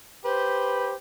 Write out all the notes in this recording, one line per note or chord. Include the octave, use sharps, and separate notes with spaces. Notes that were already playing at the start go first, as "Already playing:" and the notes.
G4 B4 C5